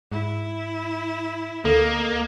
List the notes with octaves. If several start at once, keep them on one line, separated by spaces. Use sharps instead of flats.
G#2 E4
D2 A#3 A4 D#5